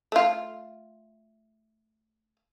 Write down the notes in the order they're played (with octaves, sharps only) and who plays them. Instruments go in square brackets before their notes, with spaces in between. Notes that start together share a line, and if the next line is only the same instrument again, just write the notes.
[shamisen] A3 F4